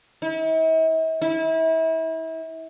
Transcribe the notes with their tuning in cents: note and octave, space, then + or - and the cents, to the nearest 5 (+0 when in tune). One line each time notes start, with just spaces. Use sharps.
E4 -45
E4 -30